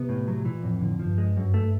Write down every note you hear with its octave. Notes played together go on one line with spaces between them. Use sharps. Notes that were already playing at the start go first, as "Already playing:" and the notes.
Already playing: C3 B3
A2
F#3
A#2 E3
F2 A2
A2 D3
F3
G2
G#3
F#2
A3